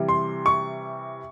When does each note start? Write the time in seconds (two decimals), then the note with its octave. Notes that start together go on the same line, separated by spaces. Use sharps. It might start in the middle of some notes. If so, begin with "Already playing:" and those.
Already playing: C3 E3 G3
0.09 C6
0.46 C#6